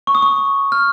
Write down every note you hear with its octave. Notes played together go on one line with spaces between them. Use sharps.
C#6
D#6
C#6
F6